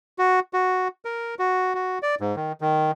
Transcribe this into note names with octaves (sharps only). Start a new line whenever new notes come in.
F#4
F#4
A#4
F#4
F#4
D5
G#2
D#3
D#3